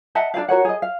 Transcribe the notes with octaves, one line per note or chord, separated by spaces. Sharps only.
D#5 E5 F#5 A5
D4 G#4 D5 F5
F#4 A#4 C#5 F#5
G#4 D#5
F5